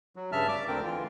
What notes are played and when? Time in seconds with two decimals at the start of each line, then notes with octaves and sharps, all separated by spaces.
0.16 F#3
0.32 G2 C#3 E5 A5 F6
0.48 D5 D6
0.68 D2 D3 C4 A#4 G5
0.83 D3 E3 F4